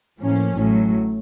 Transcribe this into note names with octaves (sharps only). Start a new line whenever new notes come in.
A2 F3 A#3 C#4
A1 A2 F#3